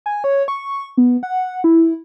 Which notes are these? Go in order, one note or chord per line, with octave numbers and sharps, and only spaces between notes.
G#5
C#5
C#6
B3
F#5
E4